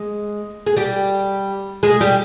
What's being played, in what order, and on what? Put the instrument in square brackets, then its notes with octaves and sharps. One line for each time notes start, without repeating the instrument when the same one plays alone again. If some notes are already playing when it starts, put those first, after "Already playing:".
Already playing: [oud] G#3
G#4
G3 G4
G#3 G#4
G3 G4